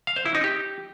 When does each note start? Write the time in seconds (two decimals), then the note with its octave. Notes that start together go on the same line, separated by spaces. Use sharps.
0.07 F5
0.16 C5
0.26 E4
0.35 D#4
0.44 G4